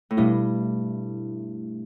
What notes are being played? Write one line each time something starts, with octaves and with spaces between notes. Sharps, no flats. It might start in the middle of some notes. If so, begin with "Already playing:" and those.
A2
G2 B2 A3 E4